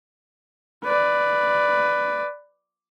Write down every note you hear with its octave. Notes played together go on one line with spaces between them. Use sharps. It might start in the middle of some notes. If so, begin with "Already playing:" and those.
B4 D5